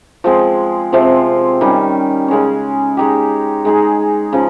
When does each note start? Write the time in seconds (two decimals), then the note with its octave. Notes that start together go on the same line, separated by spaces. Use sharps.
0.24 F3 G#3 C4
0.93 C3 F3 G#3 C4
1.61 D#3 G3 C#4
2.28 C#3 G#3 C#4
2.97 G#3 D#4 G4
3.65 G#3 D#4 G#4
4.33 C#3 F3